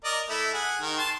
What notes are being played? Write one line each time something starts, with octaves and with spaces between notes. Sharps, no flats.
A#4 D5 D#5
A3 E4
G#4 F#5
D#3
A5 C6